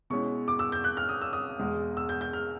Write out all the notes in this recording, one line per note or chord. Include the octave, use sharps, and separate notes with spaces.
B2 G#3 C#4 E4 C#6
D6
E6
G6
F#6
F6
D#6
E6
D#6
E2 B2 G#3
E6
G6
G6
F6